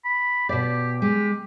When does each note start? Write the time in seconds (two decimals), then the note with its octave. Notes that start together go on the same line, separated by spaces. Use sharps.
0.05 B5
0.49 B2 G4 D5
1.02 G#3 G4